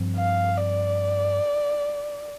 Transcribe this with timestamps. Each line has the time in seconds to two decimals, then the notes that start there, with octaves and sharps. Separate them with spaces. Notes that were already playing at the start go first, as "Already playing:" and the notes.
Already playing: G2 F3 C4
0.17 F5
0.58 D5